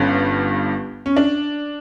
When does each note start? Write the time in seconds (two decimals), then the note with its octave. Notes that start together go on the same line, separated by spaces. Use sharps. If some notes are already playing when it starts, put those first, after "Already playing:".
Already playing: G1 G2 D3 C#4
1.06 C#4
1.17 D4